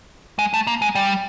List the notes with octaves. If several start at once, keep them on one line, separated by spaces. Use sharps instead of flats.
G#3
A3
A#3
G#3
G3